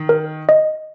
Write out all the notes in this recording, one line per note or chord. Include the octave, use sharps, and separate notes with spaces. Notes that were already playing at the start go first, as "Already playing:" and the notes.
Already playing: D#3
A#4
D#5